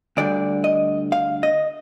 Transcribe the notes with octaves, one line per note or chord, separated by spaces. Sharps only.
D2 D3 G3 D5
D#5
F5
D#5